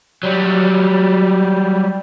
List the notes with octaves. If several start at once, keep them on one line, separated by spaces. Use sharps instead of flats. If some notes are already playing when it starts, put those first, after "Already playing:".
F#3 G3